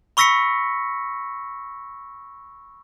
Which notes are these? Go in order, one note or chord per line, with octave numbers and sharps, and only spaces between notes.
B5 C#6 E6 A#6 B6 C#7